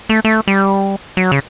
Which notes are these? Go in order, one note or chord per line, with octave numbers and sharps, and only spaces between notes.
A3
A3
G3
F#3
C#3